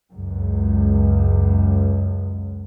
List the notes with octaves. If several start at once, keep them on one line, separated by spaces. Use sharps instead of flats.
C#2 F#2